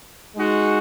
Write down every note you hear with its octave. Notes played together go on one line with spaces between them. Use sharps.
G#3 D#4 F#4